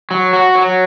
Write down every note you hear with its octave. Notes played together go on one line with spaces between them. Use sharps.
F#3
F#4
F#3